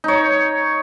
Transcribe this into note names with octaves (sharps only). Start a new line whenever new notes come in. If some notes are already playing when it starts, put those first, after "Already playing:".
D#4 C#5